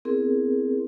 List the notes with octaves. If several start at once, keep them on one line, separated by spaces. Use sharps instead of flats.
B3 C4 E4 G#4 A#4